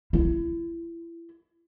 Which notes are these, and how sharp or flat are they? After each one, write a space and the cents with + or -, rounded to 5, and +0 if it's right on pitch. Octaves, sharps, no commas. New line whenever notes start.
E4 +30